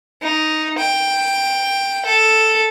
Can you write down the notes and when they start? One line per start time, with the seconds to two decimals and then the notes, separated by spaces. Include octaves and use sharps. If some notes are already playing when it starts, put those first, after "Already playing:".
0.22 D#4
0.78 G5
2.06 A4